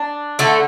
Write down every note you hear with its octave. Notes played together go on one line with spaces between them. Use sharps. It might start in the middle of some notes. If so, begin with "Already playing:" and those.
Already playing: D4
D3 A3